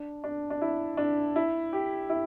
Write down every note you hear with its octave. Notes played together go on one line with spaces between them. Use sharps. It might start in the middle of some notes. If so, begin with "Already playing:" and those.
Already playing: D4
D4
D4
E4
D4
E4
G4
E4